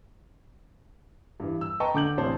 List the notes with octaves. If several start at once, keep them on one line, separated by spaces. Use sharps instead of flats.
G2 E3
E6
B4 D#5 G5 A5 A#5 C#6
D3 D6 G6 F#7
A1 C3 D4 C5 C#5 A5